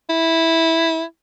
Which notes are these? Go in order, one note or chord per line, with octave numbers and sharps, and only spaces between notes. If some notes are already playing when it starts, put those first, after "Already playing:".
E4